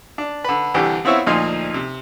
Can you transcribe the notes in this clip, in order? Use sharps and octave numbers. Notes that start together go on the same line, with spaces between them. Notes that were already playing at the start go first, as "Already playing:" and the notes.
D4
D3 B4
C2 D3 E3 G4
B3 C4 E4 F4 C#5 E5
D2 A#2 F3 D#4 C6
C3